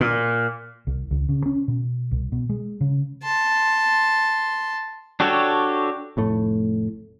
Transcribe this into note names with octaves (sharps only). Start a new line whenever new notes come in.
A#2
C2
C#2
C#3
C#4
B2
C2
B2
G#3
C#3
A5 C6
D4 F#4 G4 A4 C#5
F1 A2 A3